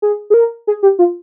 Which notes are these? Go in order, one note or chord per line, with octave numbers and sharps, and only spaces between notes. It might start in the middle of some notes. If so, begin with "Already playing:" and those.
G#4
G#4
A#4
G#4
G4
F4